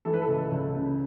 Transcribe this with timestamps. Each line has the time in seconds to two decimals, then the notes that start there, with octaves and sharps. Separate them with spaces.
0.05 E3 A4
0.14 B4
0.22 A4
0.28 C#2
0.52 C#2
0.76 C#3